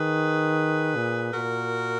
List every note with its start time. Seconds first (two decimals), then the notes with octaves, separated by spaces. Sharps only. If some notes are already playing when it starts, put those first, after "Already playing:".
Already playing: D#3 G#4 B4
0.96 A#2
1.34 A#2 F#4 A#4